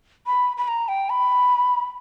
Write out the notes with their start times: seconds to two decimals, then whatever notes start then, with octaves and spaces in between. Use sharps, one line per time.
0.27 B5
0.57 B5
0.68 A#5
0.88 G5
1.10 B5